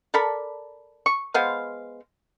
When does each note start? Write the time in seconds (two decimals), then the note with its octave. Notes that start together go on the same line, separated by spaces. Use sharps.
0.14 A4 A#4 D5 B5
1.06 C#6
1.34 G#3 B3 C5 F5